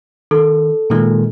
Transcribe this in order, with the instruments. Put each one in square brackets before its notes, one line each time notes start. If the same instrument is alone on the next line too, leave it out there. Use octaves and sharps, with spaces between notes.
[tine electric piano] D#3 [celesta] A4
[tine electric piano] A#2 D#3 G#3